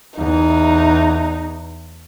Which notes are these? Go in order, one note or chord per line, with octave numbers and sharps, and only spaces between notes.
E2 D#4